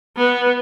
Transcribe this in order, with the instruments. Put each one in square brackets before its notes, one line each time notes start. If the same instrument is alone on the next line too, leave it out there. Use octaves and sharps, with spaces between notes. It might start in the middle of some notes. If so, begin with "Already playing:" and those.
[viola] B3